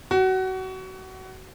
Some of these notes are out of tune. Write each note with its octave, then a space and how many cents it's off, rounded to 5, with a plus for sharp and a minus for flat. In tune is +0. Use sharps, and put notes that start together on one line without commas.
F#4 +25